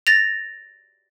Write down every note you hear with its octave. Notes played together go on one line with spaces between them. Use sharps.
A6 A#6 F7